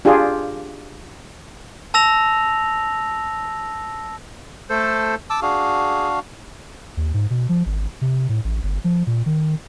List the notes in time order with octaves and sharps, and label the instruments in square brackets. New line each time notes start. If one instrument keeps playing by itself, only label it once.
[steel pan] D4 F4 G4 G#4
[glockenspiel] A5 E6 A#6 F7
[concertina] A3 A4 C5
[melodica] A5 D6 E6
[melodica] D4 F#4 F5 [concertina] G#4
[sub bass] D#2
G#2
B2
F3
G#1
C3
A2
A1
G1
F3
A#2
D#3